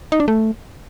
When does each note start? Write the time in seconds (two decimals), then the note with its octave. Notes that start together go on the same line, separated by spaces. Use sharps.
0.12 D#4
0.20 D4
0.28 A3